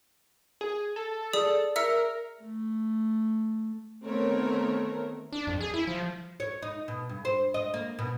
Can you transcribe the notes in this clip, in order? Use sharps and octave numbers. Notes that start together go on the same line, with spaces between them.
G#4
A4
G#4 D5 D#6
A#4 E5 E6 C#7
A3
D#3 A3 B3 C4 A#4 C#5
D4
F2
G#4
E4
F3
C#5
D#4
B2
G2
C5
D#5
A#3
B2